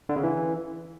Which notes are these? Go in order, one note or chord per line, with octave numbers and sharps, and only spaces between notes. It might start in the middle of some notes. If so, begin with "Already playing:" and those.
D3
C#3
E3